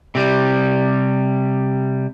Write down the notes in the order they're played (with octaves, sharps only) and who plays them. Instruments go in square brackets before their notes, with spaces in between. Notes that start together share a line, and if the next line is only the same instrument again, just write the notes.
[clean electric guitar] C3 G3